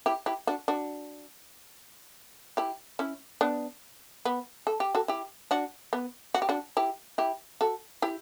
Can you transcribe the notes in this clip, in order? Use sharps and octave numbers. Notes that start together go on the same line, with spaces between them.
E4 G4
E4 G4
D4 F#4
D4 F#4
E4 G4
C#4 E4
B3 D4
B3
A4
G4
F#4 A4
E4 G4
D4 F#4
B3
F#4
G4
D4 F#4
E4 G4
E4 G4
F#4 A4
E4 G4